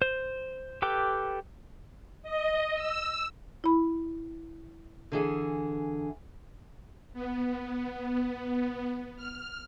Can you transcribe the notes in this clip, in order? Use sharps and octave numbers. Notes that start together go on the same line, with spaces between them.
C5
G4 A4 B4 G5 D6
D#5
E6
E4 B5
D3 E3 G#4
B3
F6